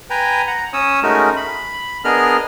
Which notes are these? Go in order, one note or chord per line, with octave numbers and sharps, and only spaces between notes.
B4 G5 G#5 A#5
F#5 A#5
C#4 C#5 D#6 E6
G#3 A3 C#4 D#4 F#4 A#4
B5
B3 D4 G#4 A#4 D#5 F6